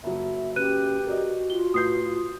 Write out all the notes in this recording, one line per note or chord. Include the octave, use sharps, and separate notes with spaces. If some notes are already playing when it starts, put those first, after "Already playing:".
F#1 F#3 E5
C#4 G4 B4 F#6 D#7
F#4 A#4 D5 D#5
F4 G7
A2 B4 D#6 G6 C7